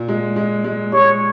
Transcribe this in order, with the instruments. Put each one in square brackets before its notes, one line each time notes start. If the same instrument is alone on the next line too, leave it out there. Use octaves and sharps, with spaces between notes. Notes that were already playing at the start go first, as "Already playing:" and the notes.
Already playing: [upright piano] A#2
G#3
G#3
G#3
[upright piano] G#3 [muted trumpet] C#5